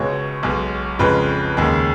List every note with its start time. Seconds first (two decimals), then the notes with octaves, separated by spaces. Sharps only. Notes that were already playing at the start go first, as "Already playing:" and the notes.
Already playing: C#2 B2 G#3 C#5
0.43 B1 B2 G#3
0.99 F2 C#3 G#3 B4
1.57 D#2 C#3 G#3